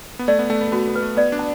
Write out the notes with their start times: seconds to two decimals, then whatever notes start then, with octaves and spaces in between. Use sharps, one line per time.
0.19 B3
0.28 A3 D5
0.39 B3
0.50 A3 A5
0.61 B3
0.68 A3
0.72 B3 F#4
0.87 B3
0.95 B4
1.02 A3
1.17 B3 D5
1.32 D4
1.39 A5